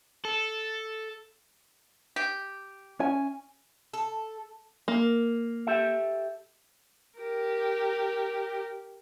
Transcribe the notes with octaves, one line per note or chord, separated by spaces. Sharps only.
A4
G4
C#4 G#5
A4
A#3
G4 A4 E5
G4 A#4